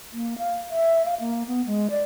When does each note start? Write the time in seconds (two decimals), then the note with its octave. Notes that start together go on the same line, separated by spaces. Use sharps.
0.13 A#3
0.38 F5
0.70 E5
1.05 F5
1.20 A#3
1.47 B3
1.66 G#3
1.90 D5